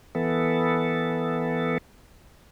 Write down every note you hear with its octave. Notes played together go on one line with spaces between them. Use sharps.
E3 B3 A4